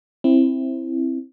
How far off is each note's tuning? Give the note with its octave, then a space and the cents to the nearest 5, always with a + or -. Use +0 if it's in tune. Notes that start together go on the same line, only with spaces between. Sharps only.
C4 +15 E4 +0